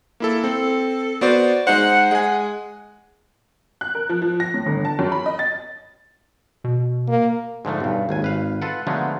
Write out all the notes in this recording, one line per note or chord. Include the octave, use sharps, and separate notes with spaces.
A#3 E4 A4
C4 A4
B3 F#4 C5 D5
G#3 D#4 C5 F#5
G#3 F#5 G#5
F#6
A#4
F3
F3
A#6
A2
G1
A5
F#2
B5
D#5
A6
B2
A#3
G#2 D3 F3 A3
B1 G2
G#1 D#2 G#5
G#1 B4 F5
F4 A4 B4 F#5
D3 F3 F#3 G#3 A3 B3